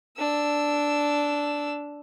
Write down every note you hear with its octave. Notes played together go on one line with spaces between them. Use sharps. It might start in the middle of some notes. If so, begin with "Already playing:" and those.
D4 E6